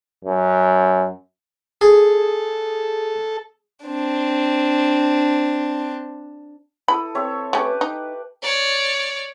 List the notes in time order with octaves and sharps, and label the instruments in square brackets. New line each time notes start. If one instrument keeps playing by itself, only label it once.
[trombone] F#2
[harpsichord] G#4 [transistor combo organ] A4
[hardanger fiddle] C4 D4
[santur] E4 A4 D#6 [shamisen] B5
[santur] C4 C#5 E5
[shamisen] A3 C#4 [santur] G4 B4 D6
[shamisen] D#4
[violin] C#5 D5